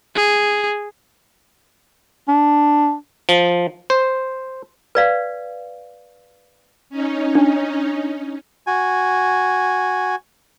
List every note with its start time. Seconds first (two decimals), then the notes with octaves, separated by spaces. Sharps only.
0.15 G#4
2.28 D4
3.29 F3
3.90 C5
4.95 B4 D5 F5
6.90 C#4 D#4
7.35 D4
8.67 F#4 G#5